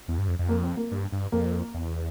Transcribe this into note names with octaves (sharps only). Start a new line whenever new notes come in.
E2
G2
F2
F2
A#3
C4
A#3
G2
G2
F2 A#3
E2